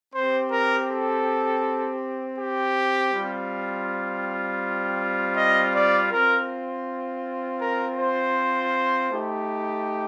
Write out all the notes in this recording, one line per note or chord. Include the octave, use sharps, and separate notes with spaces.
C4 G4 C5
A#4
A4
G4
G3 C4 F4
D#5
D5
C4 F4 A#4
A#4
C5
A3 D#4 G4